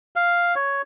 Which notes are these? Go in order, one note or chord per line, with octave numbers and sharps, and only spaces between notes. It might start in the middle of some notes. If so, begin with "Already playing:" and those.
F5
C#5